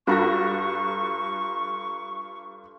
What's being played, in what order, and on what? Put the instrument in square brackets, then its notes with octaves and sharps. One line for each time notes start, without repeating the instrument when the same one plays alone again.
[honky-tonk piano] G2 F#4 B5 [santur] F4 A4 A#5 [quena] C#6